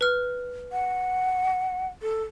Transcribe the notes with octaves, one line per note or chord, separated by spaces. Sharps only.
B4 F6
F#5
A4